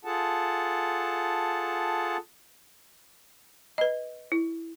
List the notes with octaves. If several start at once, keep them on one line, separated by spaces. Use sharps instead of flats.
F4 G#4 A4 F#5 A5
B4 D#5
E4